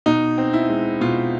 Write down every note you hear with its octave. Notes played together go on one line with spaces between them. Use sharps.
B2 D#4
C4
E4
G#3
B2 F4